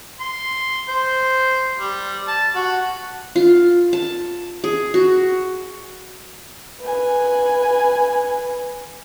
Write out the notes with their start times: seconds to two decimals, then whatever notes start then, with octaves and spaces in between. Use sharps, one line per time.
0.20 C6
0.89 C5
1.78 G3
2.28 A5
2.55 F#4
3.36 F4
3.93 A5
4.64 G#4
4.94 F#4
6.81 B4 G#5